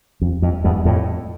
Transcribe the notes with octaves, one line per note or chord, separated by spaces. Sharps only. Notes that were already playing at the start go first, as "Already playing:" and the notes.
F2
F2
E2 G2
F2 A2